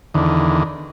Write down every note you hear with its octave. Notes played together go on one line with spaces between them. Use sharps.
E2 D3 D#3